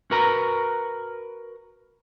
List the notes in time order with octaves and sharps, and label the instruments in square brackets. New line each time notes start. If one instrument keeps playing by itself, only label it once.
[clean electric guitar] F#4 A#4 B4 A#5